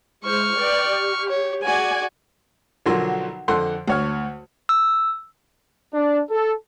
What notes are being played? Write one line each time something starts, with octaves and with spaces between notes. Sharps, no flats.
G#3 E4 C5 C#6 F6
B4 D5 G5
G4
C#5
F#4 G#4 D5 G#5
B1 D3 F3 F#3 A#4 C6
F2 D3 A4 F#5 C6
D2 C#5 F6
E6
D4
A4